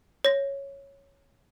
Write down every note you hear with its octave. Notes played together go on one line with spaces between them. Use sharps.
C#5 A#6